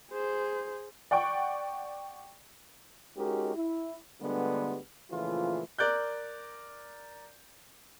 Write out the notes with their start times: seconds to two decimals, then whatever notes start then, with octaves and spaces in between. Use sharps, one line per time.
0.11 G#4 C5
1.11 D5 F#5 G5 C#6
3.16 G#3 C#4 D#4 F#4 G4 A#4
3.55 E4
4.21 D2 G2 D3 G3 G#3 B3
5.11 A#2 C#3 E3 F3 A3 F4
5.79 A#4 D5 F#6 G6